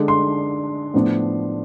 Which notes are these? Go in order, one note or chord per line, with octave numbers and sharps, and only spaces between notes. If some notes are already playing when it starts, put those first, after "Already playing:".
Already playing: D3 G#3 D4
C6
A2 F3 B3 D4